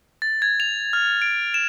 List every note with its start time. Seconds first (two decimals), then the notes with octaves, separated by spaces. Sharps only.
0.22 A6
0.42 G#6
0.60 F7
0.93 F6
1.22 D7
1.54 E7